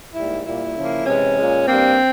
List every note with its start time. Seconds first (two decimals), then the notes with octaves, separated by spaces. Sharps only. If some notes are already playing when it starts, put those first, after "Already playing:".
0.15 G#2 G3 A#3 E4
0.45 A#2 G3 A#3 E4
0.76 C#3 F3 A#3
1.06 C3 E3 G#3 C#4
1.37 A#2 G#3
1.68 G2 G3 A#3 C4